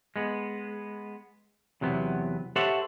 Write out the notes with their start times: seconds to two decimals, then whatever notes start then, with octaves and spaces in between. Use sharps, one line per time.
0.16 G#3 B3
1.81 E2 C3 F#3 B3
2.56 G4 A4 C5 C#5 E5 F#5